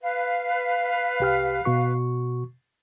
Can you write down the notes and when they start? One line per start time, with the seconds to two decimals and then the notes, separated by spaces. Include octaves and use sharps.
0.01 B4 F5
1.20 C2 G4 F6
1.65 B2 F#4 C#6